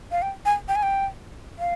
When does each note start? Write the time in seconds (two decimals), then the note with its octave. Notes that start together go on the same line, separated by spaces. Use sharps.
0.12 F5
0.22 G5
0.45 G#5
0.68 G5
0.76 G#5
0.83 G5
1.59 F5